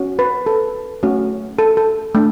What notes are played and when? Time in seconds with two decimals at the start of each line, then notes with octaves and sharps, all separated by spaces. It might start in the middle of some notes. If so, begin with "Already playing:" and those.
Already playing: C#4 F#4
0.19 B4
0.46 A4
1.03 A3 C#4 F#4
1.59 A4
1.77 A4
2.15 A3 D4